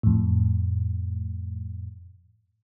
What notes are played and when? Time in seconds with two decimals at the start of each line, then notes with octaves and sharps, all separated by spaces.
0.03 F2 A2